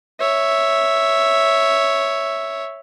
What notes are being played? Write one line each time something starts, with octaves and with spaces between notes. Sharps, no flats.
C#5 E5